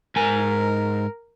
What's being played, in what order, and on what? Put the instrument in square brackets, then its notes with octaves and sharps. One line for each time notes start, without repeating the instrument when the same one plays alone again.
[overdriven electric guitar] G#2 G#5 [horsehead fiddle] A#4